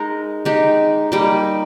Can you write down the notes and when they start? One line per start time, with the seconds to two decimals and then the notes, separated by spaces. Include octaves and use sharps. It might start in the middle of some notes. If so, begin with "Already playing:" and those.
Already playing: G#3 D#4 A#4
0.45 G#3 D#4 G4
1.12 G3 A#3 D#4